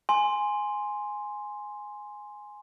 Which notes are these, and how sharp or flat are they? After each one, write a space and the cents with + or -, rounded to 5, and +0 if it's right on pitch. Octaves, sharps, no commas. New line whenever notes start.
G#5 +0 C6 +0